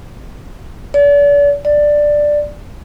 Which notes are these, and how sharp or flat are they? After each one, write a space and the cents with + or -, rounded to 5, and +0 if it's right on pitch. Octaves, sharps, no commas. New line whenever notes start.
D5 -40
D5 +5